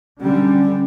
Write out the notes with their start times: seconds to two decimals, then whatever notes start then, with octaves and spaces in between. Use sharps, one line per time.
0.21 D3 G3 C#4